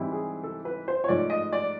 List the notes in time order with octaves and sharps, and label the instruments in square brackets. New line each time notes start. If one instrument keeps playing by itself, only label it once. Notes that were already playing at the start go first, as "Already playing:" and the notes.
Already playing: [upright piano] G#2 E3 G3 C4 E4
G#4
A4
B4
C5
C#5
G#2 F3 A3 D5
D#5
D5